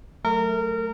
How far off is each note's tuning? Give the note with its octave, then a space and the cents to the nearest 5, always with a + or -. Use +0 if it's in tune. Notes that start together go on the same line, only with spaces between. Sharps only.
F#3 +0 A3 +0 A#4 -25